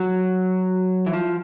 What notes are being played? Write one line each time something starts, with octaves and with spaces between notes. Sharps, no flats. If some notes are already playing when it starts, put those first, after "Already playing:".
Already playing: F#3
E3
F3